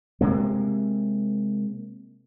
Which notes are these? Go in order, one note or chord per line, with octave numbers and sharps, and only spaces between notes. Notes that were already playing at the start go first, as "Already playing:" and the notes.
C3 G#3 A#3